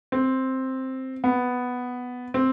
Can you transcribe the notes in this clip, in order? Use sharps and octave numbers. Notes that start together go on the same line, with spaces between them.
C4
B3
C4